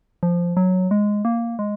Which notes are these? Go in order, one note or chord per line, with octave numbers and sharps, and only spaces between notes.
F3
F#3
G#3
A#3
G#3